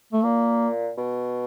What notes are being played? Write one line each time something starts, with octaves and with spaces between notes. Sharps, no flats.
A3
A#2 A#3
B2